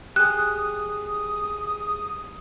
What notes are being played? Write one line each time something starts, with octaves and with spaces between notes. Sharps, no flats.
G4 G#4 D#6 F#6